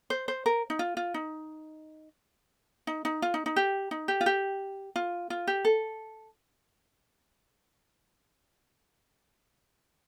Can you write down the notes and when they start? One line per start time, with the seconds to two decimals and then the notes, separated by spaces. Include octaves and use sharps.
0.10 C5
0.28 C5
0.46 A#4
0.70 D#4
0.79 F4
0.97 F4
1.14 D#4
2.87 D#4
3.05 D#4
3.22 F4
3.34 D#4
3.46 D#4
3.56 G4
3.91 D#4
4.08 G4
4.21 F4
4.26 G4
4.96 F4
5.30 F4
5.47 G4
5.65 A4